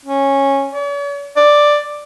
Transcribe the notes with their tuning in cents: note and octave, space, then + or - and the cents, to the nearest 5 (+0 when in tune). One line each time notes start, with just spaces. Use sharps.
C#4 -10
C#5 +45
D5 +5